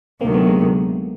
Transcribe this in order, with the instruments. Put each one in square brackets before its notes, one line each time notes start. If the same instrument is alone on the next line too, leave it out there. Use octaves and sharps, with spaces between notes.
[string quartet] D2 C3 D#3 F#3 [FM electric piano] A#3 C4
[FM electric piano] A3 B3
G#3 A#3